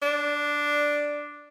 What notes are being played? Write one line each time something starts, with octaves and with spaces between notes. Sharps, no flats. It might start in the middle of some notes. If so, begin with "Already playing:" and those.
D4